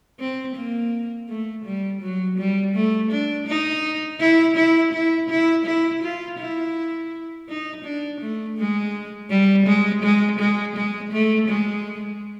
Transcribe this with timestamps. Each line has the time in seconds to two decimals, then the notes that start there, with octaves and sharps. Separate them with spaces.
0.19 C4
0.56 A#3
1.29 A3
1.65 G3
2.02 F#3
2.38 G3
2.74 A3
3.11 D4
3.47 D#4
4.20 E4
4.57 E4
4.93 E4
5.30 E4
5.66 E4
6.02 F4
6.39 E4
7.49 D#4
7.84 D4
8.21 A3
8.57 G#3
9.30 G3
9.66 G#3
10.03 G#3
10.39 G#3
10.76 G#3
11.12 A3
11.48 G#3